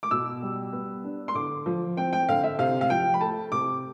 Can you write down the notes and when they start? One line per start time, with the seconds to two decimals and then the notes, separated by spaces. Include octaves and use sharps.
0.03 D6
0.11 B2 E6
0.42 G3
0.73 B3
1.04 D4
1.28 C6
1.35 D3 D6
1.66 F3
1.97 C4 G5
2.13 G5
2.28 D3 F5
2.44 E5
2.59 C3 F5
2.81 F5
2.90 F3 G5
3.14 B5
3.21 A3 A5
3.52 C3 D6